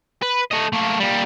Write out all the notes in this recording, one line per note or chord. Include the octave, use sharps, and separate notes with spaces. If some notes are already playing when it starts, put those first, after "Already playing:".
B4
A3 D#5
A3 A#3
A#2 G3